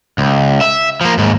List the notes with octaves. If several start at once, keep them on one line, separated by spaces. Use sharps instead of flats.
C#2
E5
F3 A#3
D#2 G#2